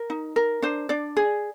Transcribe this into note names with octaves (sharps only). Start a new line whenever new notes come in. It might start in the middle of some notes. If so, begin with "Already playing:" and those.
Already playing: A#4
D#4
A#4
D4 C5
D4 D5
G#4